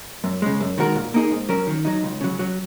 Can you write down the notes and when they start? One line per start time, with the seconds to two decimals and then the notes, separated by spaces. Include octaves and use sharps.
0.24 F#2
0.42 C#3 G#3
0.60 F#2
0.78 D#3 G#3 F#4 A#4
0.96 A#2
1.14 A#3 D#4 G#4
1.31 G#2
1.49 F#3 C#4 A#4
1.67 D#3
1.85 F#3 D#4
2.03 C#2
2.21 C#3 F#3
2.39 F#3